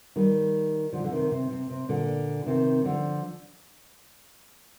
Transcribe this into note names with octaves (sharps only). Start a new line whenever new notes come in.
D#3 G3
D3 F3
D3
C3 D#3
C3
C3
C3
A#2 D3
C3 D#3
D3 F3